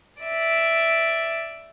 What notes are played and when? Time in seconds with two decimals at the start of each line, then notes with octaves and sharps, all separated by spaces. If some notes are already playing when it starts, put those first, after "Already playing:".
0.23 D5 E5